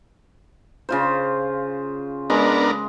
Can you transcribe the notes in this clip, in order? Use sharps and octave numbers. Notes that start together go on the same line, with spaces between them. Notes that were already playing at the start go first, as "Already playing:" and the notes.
C#3 F4 C5
G#3 B3 D4 A#4